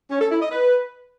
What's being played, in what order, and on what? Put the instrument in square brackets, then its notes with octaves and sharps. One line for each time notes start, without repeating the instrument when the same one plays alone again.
[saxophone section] C#4
A4
E4
D#5
B4